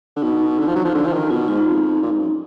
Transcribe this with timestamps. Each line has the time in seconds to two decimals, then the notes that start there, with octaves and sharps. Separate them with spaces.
0.16 D3
0.22 B2 D#4
0.59 D3
0.68 F3
0.76 F#3
0.85 F3
0.95 D3
1.06 F3
1.13 D#3
1.30 B2 F4
1.48 G#2 F4
1.57 D#4
1.67 F2
2.02 A#2
2.11 G#2
2.19 F#2